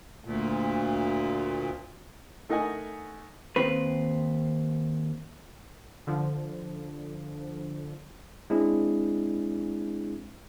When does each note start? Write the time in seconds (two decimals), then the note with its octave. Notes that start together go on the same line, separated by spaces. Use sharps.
0.25 D2 A#2
2.49 A3 D#4 A#4 D#5 F#5 G#5
3.56 D#2 C4 B4
6.07 D3 F3
8.50 G#3 C4 D4 E4 G#4